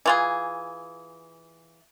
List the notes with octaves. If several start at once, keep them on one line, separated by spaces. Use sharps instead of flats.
E3 F4 G#4